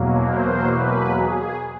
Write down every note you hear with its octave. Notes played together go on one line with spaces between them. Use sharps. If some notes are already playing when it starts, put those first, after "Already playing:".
Already playing: E2 B2 F#3 A#3
C5
B4
G#4